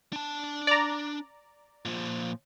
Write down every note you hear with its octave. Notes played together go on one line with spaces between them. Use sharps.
D4 A5
D5 A#5
A#2 F3